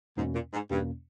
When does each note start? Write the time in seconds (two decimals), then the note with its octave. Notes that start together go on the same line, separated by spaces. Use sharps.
0.17 E2 G#2 B2 A#3 C#4
0.35 A#2
0.54 G#2
0.71 E2 G2 B2 A#3 C#4